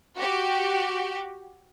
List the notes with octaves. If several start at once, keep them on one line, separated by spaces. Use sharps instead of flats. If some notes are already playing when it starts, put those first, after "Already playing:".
F#4 G4